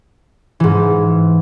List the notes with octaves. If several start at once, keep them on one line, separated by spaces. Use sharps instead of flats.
G#2 E3